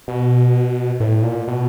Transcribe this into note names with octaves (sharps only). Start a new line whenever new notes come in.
B2
A2
A#2
B2